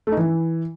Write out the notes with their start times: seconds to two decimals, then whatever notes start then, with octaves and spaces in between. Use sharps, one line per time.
0.07 A3
0.12 D#4
0.17 E3